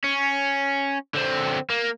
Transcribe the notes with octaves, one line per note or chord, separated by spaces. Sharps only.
C#4
D3 C4
A#3